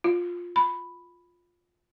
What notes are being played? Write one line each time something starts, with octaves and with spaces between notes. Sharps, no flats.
F4
B5